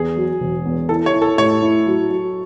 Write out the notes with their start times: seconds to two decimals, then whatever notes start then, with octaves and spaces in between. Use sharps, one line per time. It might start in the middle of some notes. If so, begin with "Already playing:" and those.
Already playing: E2 G#4
0.17 F#3
0.41 E1
0.65 E2
0.89 E4 A4
1.06 C#5
1.14 E4
1.22 A4
1.38 A2 C#5
1.62 E4
1.86 F#3
2.10 F#3